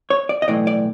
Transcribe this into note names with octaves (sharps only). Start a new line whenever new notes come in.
C#5
D5
D#5
B1 A2 E3 A3 D5
D5